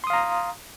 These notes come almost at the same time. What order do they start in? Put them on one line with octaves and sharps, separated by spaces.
C6 D#6 F5 A#5